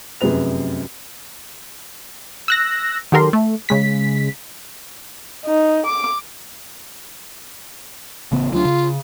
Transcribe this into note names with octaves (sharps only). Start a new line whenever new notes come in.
F1 F#2 C3 G#4 B4 F7
E6 F#6 A#6
D#3 F#3 G4 A4 A#4 C6
A3
C#3 G#3 B6
D#4
D6
A1 C#3 B3
D2 F#3 D4 F4
C#3